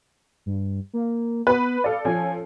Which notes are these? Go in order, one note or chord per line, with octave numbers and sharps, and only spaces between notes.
G2
A#3
B3 B4 B5
A4 D5 F5
F3 C#4 A4 G#5